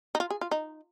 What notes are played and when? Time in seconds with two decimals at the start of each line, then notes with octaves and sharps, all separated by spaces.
0.15 D#4
0.20 F4
0.30 G#4
0.41 F4
0.51 D#4